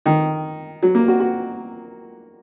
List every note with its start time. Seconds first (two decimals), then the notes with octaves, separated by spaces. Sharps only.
0.06 D#3
0.83 F#3
0.95 A#3
1.08 F#4
1.20 F#4